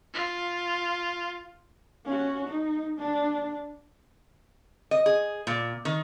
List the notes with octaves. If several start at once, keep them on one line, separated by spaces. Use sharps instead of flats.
F4
C#4 F#4
D#4
D4
D#5
G#4
A#2
D#3